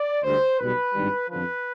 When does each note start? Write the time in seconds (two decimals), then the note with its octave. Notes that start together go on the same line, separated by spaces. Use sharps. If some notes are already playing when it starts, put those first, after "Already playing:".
Already playing: D5
0.23 D2 D3 G3 C5
0.59 B1 B2 G3 B4
0.94 G#1 G2 D#3 G3
1.28 F2 D3 F3 B4